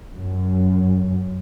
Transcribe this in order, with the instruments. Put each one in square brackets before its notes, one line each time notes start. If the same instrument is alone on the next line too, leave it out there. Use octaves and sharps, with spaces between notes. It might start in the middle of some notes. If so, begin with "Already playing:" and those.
[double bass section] F#2